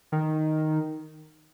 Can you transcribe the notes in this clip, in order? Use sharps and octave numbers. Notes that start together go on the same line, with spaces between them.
D#3